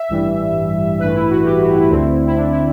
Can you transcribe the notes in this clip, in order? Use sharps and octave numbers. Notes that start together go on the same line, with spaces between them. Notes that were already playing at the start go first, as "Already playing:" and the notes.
Already playing: E5
A1 G2 E3 G3
A1 G2 E3 A3 B4
E4
F#4
G4
F#4
E4
D2 D3 A3 C4
E4
D4
E4